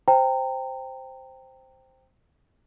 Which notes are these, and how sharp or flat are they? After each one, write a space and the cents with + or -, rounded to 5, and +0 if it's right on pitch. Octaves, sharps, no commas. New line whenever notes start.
C5 +0 G5 +5 A#5 -30